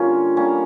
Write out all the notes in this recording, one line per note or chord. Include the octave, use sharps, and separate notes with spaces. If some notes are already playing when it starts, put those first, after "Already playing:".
Already playing: D3 G3 A#3 C#4 F4
D3 G3 A#3 C#4